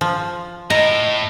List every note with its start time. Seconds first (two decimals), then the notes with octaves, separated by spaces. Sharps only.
0.01 F3
0.70 A2 D#5 A#5